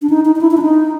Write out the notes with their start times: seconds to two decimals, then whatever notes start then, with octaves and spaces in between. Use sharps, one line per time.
0.02 D4
0.10 D#4
0.25 D#4
0.36 D#4
0.41 E4
0.51 E4
0.57 D4
0.62 D#4